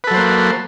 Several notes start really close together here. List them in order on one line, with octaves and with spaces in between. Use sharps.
B4 A4 F#3 C5 A#3